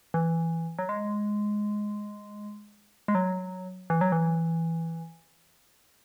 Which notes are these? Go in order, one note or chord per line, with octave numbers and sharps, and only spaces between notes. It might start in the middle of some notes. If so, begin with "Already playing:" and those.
E3
F#3
G#3
G#3
F#3
E3
F#3
E3